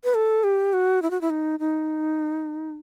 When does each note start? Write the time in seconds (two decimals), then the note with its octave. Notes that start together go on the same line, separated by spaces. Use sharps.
0.04 B4
0.15 A4
0.44 G4
0.73 F#4
1.02 E4
1.11 F#4
1.21 E4
1.30 D#4
1.60 D#4